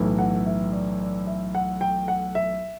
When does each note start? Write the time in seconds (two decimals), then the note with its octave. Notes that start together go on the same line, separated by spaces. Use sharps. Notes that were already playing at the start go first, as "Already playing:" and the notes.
Already playing: B1 A2 E3
0.19 F#5
0.46 E5
0.72 D5
1.01 D5
1.27 E5
1.55 F#5
1.81 G5
2.08 F#5
2.35 E5